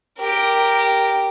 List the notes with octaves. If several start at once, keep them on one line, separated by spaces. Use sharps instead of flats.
G4 A#4